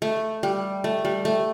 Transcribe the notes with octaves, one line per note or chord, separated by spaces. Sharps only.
A3
G3
A3
G3
A3